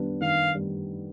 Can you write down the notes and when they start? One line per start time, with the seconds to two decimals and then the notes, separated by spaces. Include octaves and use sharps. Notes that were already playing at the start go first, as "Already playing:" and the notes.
Already playing: D#3 G3 B3 D4
0.21 D#3 F5
0.55 G3